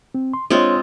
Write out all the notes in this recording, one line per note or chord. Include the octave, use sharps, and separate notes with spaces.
C4
C6
G#3 C4 D4 F4 C#5